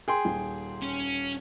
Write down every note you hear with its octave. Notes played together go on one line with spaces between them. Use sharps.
G#4 G5 C6
D#1
C#4